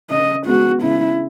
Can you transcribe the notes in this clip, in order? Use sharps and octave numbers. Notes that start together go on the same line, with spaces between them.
C#3 D#5
G#3 B3 F#4
C#3 E4